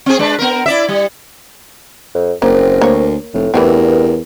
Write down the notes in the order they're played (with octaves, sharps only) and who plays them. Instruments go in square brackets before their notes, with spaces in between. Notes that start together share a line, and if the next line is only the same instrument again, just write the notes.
[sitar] C4 G#4
G#3 D4 B4
B3 A#4
E4 D5 E5
G3
[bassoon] F2
[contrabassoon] F#1 [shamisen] A#3 [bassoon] C4 [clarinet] A#4
[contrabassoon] D2 [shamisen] A#3 C#5
[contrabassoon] F1 [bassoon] A2
[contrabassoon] E2 [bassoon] G2 [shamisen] E3 A3 C4 [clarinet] A#4